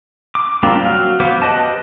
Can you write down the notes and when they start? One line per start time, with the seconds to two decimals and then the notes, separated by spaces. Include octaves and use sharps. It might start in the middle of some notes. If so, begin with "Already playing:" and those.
0.35 D6
0.63 G3 A#3 C4 D4 F4
0.85 F#3 F5
1.20 F#3 B3 C5 D6
1.42 G4 B4 C5 D#5 A5